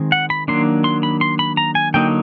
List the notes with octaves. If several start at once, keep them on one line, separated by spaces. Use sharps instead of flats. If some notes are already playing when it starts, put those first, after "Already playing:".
Already playing: D#3 G#3 C4 D#4
F#5
B5
D#3 F#3 A#3 D4 C6
C6
B5
C6
B5
A#5
G#5
D3 F#3 A#3 D#4 G5